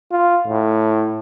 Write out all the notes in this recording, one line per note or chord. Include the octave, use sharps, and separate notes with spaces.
F4
A2